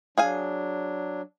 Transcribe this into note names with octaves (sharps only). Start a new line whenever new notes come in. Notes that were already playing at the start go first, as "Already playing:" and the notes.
F#3 D4 G#4 F5 G#5